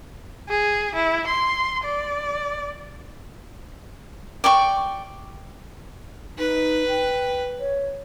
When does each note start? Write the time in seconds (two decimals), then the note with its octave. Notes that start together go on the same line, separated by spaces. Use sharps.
0.49 G#4
0.95 E4
1.28 C6
1.85 D5
4.44 D5 G5 C#6
6.38 D#4 B4
6.88 G5
7.60 C#5